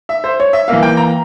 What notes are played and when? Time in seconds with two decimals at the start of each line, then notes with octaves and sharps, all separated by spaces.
0.09 E5
0.24 C5
0.40 C#5
0.53 E5
0.68 E3 A#3 F5
0.83 G5
0.97 A#5